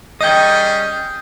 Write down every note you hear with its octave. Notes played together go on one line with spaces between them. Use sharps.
G3 C#4 G#4 D#5 G5 D#6 G6